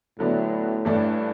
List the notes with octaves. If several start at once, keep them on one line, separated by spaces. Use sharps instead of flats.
A2 D3 F#3 B3 D4
G2 E3 A3 D4